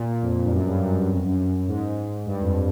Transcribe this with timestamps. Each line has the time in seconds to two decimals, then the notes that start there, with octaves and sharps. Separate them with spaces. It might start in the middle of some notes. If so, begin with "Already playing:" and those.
Already playing: A#2
0.22 F2
0.44 G2
0.52 F#2
0.66 G2
0.81 F#2
0.95 F#2
1.09 F2
1.25 F#2
1.39 F#2
1.68 G#2
2.26 G2
2.41 F2